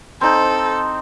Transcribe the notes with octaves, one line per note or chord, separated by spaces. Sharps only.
C4 D#4 A4